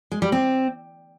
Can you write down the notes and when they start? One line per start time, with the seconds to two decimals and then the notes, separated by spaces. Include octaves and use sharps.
0.12 G#3
0.22 G3
0.32 C4